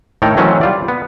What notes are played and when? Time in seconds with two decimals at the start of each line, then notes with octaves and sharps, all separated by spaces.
0.22 A2 D#3 A4 C#5 G5 A#5
0.37 D#3 E3 F#3 A3 C4 C#4
0.61 G3 F4 D5
0.88 B3